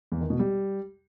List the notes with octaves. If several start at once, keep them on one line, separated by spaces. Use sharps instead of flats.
E2
D#3
B2
G3